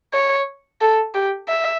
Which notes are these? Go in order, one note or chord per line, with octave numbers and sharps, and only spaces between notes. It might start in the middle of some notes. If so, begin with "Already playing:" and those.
C#5
A4
G4
E5